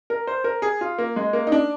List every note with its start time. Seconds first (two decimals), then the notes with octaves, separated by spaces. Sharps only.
0.10 A#4
0.27 C5
0.44 A#4
0.62 G#4
0.81 F4
0.98 A#3
1.16 G#3
1.33 A#3
1.47 D#4
1.52 D4